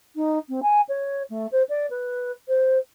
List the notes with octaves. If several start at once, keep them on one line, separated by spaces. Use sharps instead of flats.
D#4
C4
G#5
C#5
A3
C5
D5
B4
C5